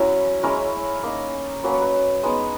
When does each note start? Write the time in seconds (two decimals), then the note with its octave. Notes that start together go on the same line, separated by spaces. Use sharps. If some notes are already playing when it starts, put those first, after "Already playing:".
Already playing: F#3 C#4 E4
0.43 G#3 C#4 E4 A#4
1.03 A#3 D#4
1.63 F#3 A#3 C#4 B4
1.73 C#5
1.82 B4
2.23 G#3 B3 D#4